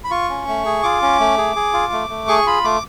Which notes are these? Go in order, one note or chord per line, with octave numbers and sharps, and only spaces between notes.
B5
F4 C#6
C#4
A3
G#4
F4 D6
C#4
A3
G#4
G#4
F4
A3
A3
G#4 C#6
F4 B5
A3 D6